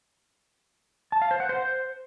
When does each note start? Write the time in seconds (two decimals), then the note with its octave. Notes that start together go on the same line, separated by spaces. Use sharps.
1.12 A5
1.22 F5
1.31 C5
1.40 F#5
1.49 C5